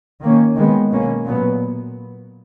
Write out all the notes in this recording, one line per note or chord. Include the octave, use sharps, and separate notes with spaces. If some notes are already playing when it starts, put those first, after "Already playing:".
D#3 A#3 C#4
D#3 G#3 B3
B2 A#3 C#4
A#2 F#3 B3